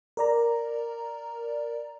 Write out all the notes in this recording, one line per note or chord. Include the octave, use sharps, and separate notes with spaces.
A#4 D5 A#5